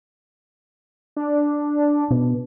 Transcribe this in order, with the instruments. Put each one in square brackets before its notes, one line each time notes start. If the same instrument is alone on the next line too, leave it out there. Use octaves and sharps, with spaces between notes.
[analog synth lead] D4
[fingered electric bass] B2